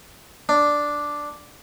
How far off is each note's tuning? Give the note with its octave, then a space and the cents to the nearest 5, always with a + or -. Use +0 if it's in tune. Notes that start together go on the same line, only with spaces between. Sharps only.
D4 +0